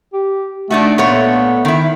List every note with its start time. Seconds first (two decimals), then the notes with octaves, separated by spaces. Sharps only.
0.13 G4
0.71 A3 D4 D#4 F#4
0.98 A#2 A3 B3 C#5
1.65 D#3 E4